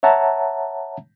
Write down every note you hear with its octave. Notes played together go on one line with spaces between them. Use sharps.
C#5 E5 F#5 A5 A#5